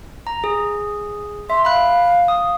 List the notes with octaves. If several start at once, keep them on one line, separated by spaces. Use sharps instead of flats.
A#5
G#4
E5 C6
F5 B5 F#6
D#6